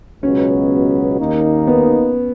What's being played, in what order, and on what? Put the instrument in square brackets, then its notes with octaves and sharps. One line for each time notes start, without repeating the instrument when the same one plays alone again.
[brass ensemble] C#2 B2 F#3 B3 [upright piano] C#4
[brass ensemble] D#2 D#3 A#3 D#4
[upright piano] B3